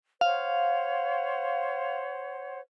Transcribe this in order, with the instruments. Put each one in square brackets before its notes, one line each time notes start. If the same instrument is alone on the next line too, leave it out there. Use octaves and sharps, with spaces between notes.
[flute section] C5 C#5 F#5 [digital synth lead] F5